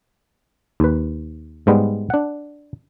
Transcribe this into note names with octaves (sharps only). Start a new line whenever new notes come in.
D#2 B4
G#2 G3 G#3 B3
D4 F#5